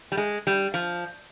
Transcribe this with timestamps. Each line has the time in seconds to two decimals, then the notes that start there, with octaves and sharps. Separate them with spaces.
0.12 G3
0.17 G#3
0.47 G3
0.74 F3